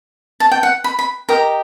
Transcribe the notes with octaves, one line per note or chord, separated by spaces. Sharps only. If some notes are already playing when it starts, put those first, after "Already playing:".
A5
G5
F#5
B5
B5
G4 A#4 D#5 A#5